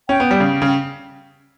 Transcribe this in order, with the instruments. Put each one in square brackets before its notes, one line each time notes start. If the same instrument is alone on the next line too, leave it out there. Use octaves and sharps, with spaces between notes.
[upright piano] C#4 [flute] G5
[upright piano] B3
G3
C#3
C#3